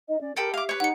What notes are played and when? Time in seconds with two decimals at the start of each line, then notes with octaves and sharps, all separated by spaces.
0.09 D#4 D#5
0.21 C#4 D5
0.36 G4 A4 A#4 G5 B5
0.54 E5 F5 D6
0.69 B4 C#5
0.80 D#4 F#5 C#7